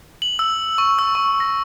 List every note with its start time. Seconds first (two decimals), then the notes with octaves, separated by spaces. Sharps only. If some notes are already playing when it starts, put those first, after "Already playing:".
0.22 F#7
0.39 E6
0.78 C#6
0.99 E6
1.15 C#6
1.40 A#6